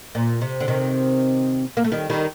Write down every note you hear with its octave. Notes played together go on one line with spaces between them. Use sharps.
A#2
C3
D3
C3 D#3
A#3
A3
D#3 G3
D#3 G3